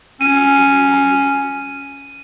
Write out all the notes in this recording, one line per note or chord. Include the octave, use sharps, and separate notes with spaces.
C#4 D#7